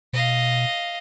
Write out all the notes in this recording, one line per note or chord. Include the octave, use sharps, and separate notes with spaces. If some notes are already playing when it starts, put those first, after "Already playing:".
B2 D#5 F5